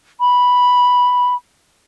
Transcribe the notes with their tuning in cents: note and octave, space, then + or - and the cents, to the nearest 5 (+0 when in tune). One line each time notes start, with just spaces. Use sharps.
B5 -5